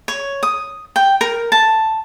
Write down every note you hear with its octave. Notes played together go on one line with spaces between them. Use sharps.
C#5
D#6
G5
A#4
A5